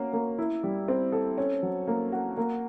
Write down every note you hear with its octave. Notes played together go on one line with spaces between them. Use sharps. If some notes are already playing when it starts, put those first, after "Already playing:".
Already playing: A#3 C#4 F#4
A#3
E4
G3
C4
A4
C#4
F#3
A#3
F#4
A#3